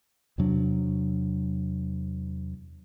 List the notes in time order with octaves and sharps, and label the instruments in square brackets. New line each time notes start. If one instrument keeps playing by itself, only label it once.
[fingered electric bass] E2 C3 F#3 D4